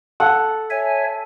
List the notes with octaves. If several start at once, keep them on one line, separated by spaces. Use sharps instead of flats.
A4 F#5
C#5 E5 G#5